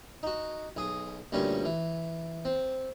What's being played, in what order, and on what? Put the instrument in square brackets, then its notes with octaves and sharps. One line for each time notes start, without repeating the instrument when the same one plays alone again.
[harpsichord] D#4 F#4
B1 G#4 D#6
D2 G2 A#2 G3 C#4 G#5
E3
C4